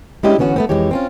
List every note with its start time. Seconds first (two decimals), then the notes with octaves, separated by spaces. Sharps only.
0.23 G#3 C#4 D4 E4 G4 D#5
0.38 D3 E3 B3 C#4 F#4
0.56 A3 B3 C4
0.69 F2 C3 E3 G#3 G4 C#5
0.91 C4 C#4 F4